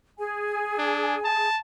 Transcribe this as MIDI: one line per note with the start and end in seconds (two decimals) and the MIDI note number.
0.18 1.47 68
0.18 1.47 80
0.78 1.16 62
1.24 1.59 81